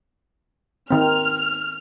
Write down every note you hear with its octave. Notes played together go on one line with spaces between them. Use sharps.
D#3 C4 F6